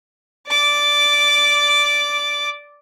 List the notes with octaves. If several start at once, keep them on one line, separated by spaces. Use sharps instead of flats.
D5 D6